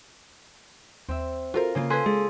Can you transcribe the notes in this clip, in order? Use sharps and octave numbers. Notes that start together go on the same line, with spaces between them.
D#2 C4 E5
F4 F#4 A4 A#4 C5
C#3 A#3 F4
A4 B4 G#5 C6 F#6 G#6 B6
G#3 G#4